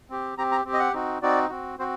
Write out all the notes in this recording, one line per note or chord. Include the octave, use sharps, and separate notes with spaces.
C4 G4
C4 G4 A#5
A#5
C4 G4
D#5
F#5
C4 D#4 F#4
C4 D#4 F#4 D5
C4 F#4
C4 F#4 C5